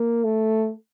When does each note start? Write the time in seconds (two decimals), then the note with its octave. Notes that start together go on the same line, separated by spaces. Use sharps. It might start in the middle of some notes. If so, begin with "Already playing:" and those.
Already playing: A#3
0.24 A3